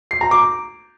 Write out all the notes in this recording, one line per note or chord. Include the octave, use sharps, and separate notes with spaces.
C7
A#5
D6